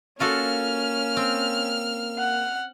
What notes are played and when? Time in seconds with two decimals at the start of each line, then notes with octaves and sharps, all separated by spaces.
0.20 A#3 C#4 F4 F#4 A4 F6
1.17 C4
2.19 F#5